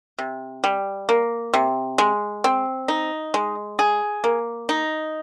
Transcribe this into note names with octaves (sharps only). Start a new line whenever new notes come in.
C3
G3
A#3
C3
G#3
C4
D#4
G#3
G#4
A#3
D#4